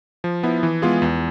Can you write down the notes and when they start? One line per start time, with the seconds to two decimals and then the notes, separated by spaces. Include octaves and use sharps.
0.24 F3
0.43 B3 E4
0.63 E3
0.82 G#3 B3 F4 G#4
1.02 E2